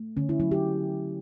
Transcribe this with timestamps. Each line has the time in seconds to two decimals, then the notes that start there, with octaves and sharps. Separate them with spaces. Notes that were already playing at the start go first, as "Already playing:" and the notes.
Already playing: A3
0.17 D3 C#4
0.29 E4
0.40 F#3 E4
0.51 G4